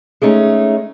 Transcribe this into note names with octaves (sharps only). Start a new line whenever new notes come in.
G#3 A3 C#4 D#4